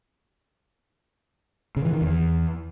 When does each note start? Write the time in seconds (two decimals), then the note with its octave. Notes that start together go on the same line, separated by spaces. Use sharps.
1.76 C#3
1.85 E3
1.93 D#3
2.01 E2